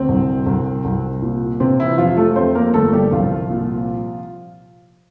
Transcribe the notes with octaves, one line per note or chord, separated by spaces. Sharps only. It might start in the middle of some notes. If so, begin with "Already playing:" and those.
Already playing: D2 C4
C2
C2
C2
A#2
C3 C4
E3 E4
F2 F3 F4
A3 A4
F2 C4 C5
A#3 A#4
G1 A3 A4
G3 G4
C2 F3 F4
A#2